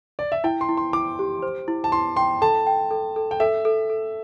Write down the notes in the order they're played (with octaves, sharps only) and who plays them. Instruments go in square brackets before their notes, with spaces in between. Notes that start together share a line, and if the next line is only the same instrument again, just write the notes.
[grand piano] D5
E5
[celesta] E4 [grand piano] G5
[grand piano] C6
[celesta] E4
[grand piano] C6
[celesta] E4 [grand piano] D6
[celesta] G4
C5
E4
[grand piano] A5
[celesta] E4 [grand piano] C6
[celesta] G5 [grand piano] C6
[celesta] A4 [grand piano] A5
[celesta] G5
A4
A4
[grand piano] G5
[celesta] A4 [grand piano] E5
[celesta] A4
A4